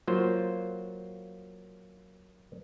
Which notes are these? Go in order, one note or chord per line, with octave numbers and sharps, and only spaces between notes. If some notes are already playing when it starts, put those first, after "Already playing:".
F#3 A#3 F4 C5